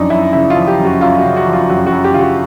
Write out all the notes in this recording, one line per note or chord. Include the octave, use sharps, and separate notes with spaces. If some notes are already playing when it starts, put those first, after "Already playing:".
Already playing: F#2 F3 D4 D#4
F#2 E4
C#3 E4
F4
F3
G4
F#2
F#4
F#2 F4
F#4
C#3
F#4
F3
F4
F#2 F#4
F#4
F#2
G4
C#3 F4
F#4